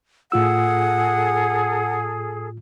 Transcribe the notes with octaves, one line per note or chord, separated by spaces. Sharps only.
A2 F4 G#4 A4 F#5 E6